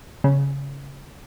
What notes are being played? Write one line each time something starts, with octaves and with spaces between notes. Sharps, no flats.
C#3